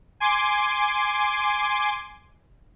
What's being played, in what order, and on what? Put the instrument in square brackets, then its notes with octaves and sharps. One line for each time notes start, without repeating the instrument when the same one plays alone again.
[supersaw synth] G#5 C6 D6